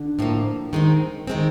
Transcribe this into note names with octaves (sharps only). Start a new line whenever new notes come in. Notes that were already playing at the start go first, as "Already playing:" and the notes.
Already playing: D3
A2 F3 A#3
D#3 G#3 C4
D#3 G#3 C4